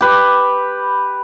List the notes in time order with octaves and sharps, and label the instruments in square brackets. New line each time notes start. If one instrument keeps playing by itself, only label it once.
[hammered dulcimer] G4 B4